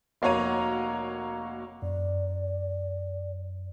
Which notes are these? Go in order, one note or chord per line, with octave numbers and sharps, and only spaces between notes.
F1 A#3 F#4 C#5 A#5 D#7
F#2 D5